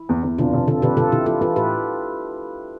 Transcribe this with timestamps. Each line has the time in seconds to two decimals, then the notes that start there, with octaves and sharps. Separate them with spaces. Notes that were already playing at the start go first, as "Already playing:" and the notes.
Already playing: E4
0.09 E2
0.23 E2
0.38 F1 D4 F4
0.54 F1
0.68 F1 F4 A4
0.82 F1 G4 B4
0.97 F1 F4 A4
1.12 F1 E4 G4
1.26 E3 F4 A4
1.41 E3 F4 A4
1.55 A2 G4 B4